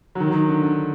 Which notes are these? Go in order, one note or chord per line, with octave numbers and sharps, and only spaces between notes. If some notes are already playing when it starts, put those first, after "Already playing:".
F#3
D#3
F#3
D#3
D3
D3